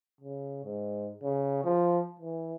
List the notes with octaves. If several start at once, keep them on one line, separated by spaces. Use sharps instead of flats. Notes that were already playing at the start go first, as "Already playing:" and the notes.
C#3
G#2
C#3
F3
E3